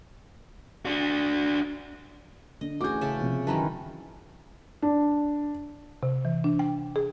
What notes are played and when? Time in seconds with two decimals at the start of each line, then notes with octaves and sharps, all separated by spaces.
0.85 D4 F#4
2.61 D3 D#5
2.81 A1 F#4 G#4 D6 G6
3.01 C#3 E5 A5
3.20 A#1 C3
3.47 F#2 D#3 E3 B4 A5 A#5
4.82 D4
6.03 C3
6.25 E3
6.44 D4
6.59 G5
6.96 G#4